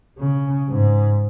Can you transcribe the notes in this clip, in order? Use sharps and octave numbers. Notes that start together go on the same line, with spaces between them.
C#3
G#2